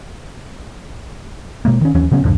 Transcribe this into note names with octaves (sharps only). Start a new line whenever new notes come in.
B2 G#3 A#3
D#3 C#4
D#2 E3 F#3 C#4
C#3 F#3 B3 C#4
C2 F2 G#2 D3